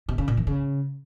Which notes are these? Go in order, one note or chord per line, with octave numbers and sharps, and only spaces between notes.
B2
C#3
A#2
E3
C#3